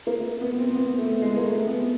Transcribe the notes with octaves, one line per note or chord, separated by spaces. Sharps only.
A#3
B3
C4
C4
B3
A3
G#3
A#3
A3
B3